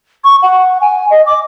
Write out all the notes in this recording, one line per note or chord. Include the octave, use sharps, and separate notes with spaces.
C#6
F#5
G#5
D#5
D6